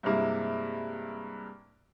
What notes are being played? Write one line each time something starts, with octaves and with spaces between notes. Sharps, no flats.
G2 C3 G#3 A#3 E4